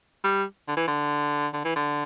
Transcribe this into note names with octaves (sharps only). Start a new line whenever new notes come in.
G3
D3
E3
D3
D3
E3
D3